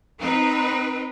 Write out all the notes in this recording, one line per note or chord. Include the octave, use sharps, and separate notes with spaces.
C4 D#4 B4